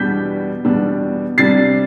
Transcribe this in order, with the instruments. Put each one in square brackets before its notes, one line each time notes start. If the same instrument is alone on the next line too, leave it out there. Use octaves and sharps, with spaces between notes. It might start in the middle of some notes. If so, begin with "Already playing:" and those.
Already playing: [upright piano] E2 B2 G3 D4 G6 B6
E2 B2 G3 D4
C3 G3 D4 A6 C7